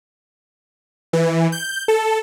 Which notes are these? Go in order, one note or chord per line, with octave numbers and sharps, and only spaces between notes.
E3
G6
A4